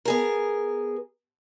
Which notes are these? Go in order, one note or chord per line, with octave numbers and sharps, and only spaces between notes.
B3 G#4 A#4